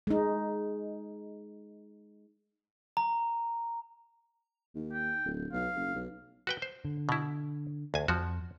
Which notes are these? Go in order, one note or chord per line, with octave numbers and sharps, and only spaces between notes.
G#3 D#4
A#5
D#2
G5
D1
B1 F5
F#1
B1
F#4 B4 G5
C5
D3
B2 E4
D2 G#5
F2 F3 F#4